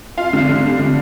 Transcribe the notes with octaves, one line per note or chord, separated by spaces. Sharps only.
F4 F5
D3
D3
G3
D3